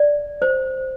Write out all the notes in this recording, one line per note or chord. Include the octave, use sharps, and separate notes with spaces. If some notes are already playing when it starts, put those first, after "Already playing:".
Already playing: D5
C5